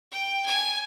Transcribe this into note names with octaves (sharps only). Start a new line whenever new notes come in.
G5
G#5